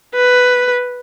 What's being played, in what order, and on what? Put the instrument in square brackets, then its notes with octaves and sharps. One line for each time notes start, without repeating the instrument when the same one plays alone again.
[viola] B4